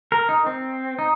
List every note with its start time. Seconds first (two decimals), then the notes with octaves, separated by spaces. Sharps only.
0.12 A#4
0.29 D#4
0.46 C4
0.99 D#4